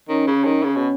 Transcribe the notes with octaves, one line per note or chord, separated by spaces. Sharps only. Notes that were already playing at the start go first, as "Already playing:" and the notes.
D#3 C#4
C#3
D#3
C#3 C#4
B2